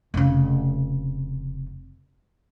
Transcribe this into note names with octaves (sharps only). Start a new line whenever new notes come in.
F1 C#3